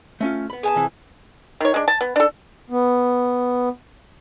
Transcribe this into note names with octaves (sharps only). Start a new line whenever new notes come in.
A3 C#4 F4
B3 B5
G#4 G#5 A5
C3 E3
D#3 C#5
G#3 D4
A5
B3
D4 A4
B3